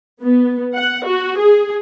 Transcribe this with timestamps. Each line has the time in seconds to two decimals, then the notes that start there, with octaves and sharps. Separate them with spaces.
0.21 B3
0.75 F#5
1.07 F#4
1.39 G#4